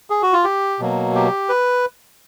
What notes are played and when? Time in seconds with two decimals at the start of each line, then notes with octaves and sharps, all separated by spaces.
0.10 G#4
0.22 F#4
0.33 F4
0.44 G4
0.79 B2 F#3 A#3
1.15 G4
1.49 B4